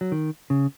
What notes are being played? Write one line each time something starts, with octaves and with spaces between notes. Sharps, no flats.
F#3
D#3
C#3